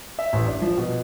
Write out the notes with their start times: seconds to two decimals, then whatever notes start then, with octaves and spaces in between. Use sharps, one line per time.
0.19 E5
0.33 A1
0.47 D4
0.62 F3
0.78 B2